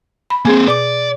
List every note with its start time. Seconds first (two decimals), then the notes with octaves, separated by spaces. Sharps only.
0.30 B5
0.45 A#3 C4 G#4 G#5
0.68 B2 D5 D6